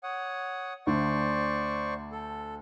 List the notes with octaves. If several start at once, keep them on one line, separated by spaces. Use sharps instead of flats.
C#5 F#5 D#6
D2 D3 C5 D5 C#6
A4